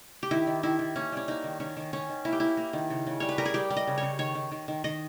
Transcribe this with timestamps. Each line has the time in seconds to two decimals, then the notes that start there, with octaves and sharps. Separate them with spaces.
0.23 G4
0.31 D#3 E4
0.47 D#3
0.63 D#3 E4
0.79 D#3
0.96 A#3 C#4
1.12 G3 C#4
1.28 A#3 D#4
1.44 D#3
1.60 D#3 C#4
1.77 D#3
1.93 D#3 C#4
2.09 D#3
2.25 A#3 E4
2.33 G4
2.40 A#3 E4
2.57 A#3
2.73 D#3
2.90 C#3
3.07 C#3
3.20 G3 C#5
3.29 B4
3.38 G3 A#4
3.45 G#4
3.54 G3 G4
3.70 G3
3.76 D#5
3.87 C#3
3.98 C#5
4.03 C#3
4.19 D#3 C#5
4.35 D#3
4.51 D#3
4.68 D#3
4.84 D#3 D#5